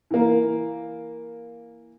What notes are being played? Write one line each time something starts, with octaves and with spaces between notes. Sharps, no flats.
E3 A#3